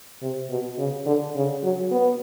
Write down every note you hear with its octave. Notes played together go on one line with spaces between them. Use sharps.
C3
B2
C#3
D3
C#3
F#3
B3